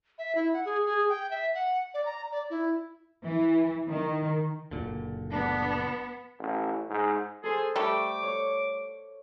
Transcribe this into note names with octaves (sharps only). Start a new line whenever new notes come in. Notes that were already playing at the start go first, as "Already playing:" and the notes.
E5
E4
F#5
G#4
G#4
G5
E5
F#5
D5
A#5
D5
E4
E3
D#3
F#1 A#2 D3
B3 D4
A1
G#2
G#4 A4 C5
G3 A3 G4 D6
C#5